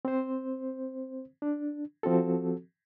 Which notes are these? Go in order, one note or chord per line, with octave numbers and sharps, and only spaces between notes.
C4 C5
D4
F3 C4 F#4 A4